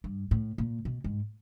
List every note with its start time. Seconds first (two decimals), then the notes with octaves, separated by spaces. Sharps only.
0.04 G2
0.31 A2
0.58 A#2
0.85 B2
1.04 G#2